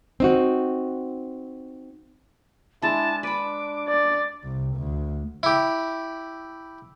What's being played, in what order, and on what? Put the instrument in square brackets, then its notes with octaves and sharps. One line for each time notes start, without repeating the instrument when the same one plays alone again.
[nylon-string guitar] C4 D#4 F#4
[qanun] G#3 D4 [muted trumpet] E4 [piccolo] A5
[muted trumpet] D4 [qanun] B4 B5 [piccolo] D6
[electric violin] D5
[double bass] C2
D2
[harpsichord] E4 G4